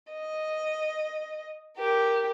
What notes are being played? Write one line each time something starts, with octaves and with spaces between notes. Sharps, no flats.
D#5
G4 A#4